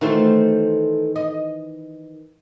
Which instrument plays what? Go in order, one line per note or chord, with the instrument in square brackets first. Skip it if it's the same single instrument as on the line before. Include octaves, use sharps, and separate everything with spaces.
[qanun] D#3 E3 C5 [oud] A3 F4 F#4
[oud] D#5